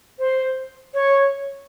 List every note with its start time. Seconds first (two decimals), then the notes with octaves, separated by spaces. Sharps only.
0.19 C5
0.94 C#5